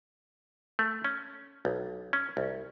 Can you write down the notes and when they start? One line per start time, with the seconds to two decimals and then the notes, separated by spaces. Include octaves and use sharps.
0.79 A3
1.05 C#4
1.65 B1
2.13 C#4
2.37 C2